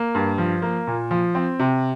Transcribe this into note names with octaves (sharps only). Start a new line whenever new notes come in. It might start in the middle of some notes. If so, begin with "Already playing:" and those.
Already playing: A#3
G2
F3
A#3
A#2
F3
C4
C3